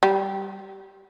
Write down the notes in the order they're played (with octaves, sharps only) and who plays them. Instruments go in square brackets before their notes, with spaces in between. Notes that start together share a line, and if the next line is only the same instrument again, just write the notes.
[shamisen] G3